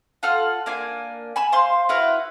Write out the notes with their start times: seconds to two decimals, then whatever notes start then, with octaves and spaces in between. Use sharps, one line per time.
0.23 F4 A4 F#5 F6
0.66 A#3 D4 G#5
1.36 G#5 B5 E6
1.52 C5 F5 C6
1.89 E4 F#4 B4 F5